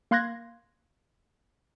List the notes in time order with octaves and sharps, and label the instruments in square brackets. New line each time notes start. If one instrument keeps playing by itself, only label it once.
[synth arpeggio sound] A#3 F5 C6 F#6 G#6 A#6